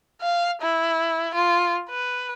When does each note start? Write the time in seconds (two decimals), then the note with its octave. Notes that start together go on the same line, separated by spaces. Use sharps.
0.21 F5
0.61 E4
1.34 F4
1.89 B4